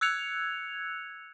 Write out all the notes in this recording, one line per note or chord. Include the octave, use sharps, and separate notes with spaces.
E6 F#6 G#6 C#7 F7